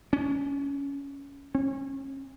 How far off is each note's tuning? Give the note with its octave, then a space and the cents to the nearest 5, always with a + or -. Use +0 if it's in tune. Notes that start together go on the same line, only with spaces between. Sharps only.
C#4 +15
C#4 -30